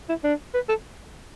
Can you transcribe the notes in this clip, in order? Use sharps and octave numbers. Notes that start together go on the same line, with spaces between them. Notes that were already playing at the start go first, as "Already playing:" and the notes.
E4
D4
B4
A4